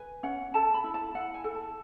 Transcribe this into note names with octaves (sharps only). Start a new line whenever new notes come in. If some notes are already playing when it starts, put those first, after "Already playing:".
Already playing: B4 G#5
C#4 F#5
A4 A5
B5
E4
A5
E4 F#5
G#5
A4
A5